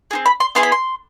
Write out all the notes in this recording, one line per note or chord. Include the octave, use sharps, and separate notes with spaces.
C4 D#4 G#4
B5
C6
B3 E4 G#4 C6
B5
C6